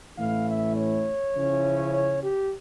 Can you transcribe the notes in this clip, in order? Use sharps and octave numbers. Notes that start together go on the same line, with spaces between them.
A2 E3 A3 C#4 E4 F5
E5
C#5
C#3 F3 C#4 E4
C#5
G4